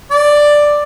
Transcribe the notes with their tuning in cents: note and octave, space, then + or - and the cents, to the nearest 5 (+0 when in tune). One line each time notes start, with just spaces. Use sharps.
D5 +5